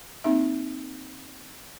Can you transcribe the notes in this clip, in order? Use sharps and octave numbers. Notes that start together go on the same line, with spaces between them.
A#3 C4 D#4 E5